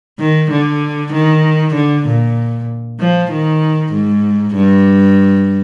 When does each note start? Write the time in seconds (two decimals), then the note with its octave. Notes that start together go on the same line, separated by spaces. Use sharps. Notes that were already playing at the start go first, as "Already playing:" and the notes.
0.19 D#3
0.51 D3
1.13 D#3
1.75 D3
2.06 A#2
2.99 F3
3.31 D#3
3.93 G#2
4.55 G2